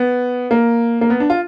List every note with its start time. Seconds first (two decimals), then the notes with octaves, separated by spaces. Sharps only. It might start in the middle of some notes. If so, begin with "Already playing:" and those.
Already playing: B3
0.51 A#3
1.01 A#3
1.10 B3
1.20 D4
1.30 F4